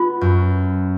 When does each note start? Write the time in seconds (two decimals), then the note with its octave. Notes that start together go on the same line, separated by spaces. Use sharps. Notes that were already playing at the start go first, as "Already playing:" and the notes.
Already playing: B3 F4
0.21 F#2